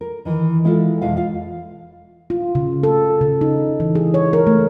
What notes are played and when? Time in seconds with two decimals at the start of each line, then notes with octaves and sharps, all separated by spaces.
0.01 A#4
0.25 D#3 E3
0.64 G#3 E4 F4 G4 A4
1.01 E2 B2 G#3 E5 F5
1.16 F4 F5
2.30 F4
2.55 C#3
2.83 A4
3.21 C#3
3.41 D#4
3.80 E3
3.95 G#4
4.14 C#5
4.33 A#4
4.47 A3